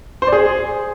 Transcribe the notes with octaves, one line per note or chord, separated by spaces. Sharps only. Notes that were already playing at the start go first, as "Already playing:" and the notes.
C5
D5
G#4